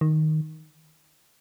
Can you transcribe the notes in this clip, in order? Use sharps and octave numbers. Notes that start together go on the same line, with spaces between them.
D#3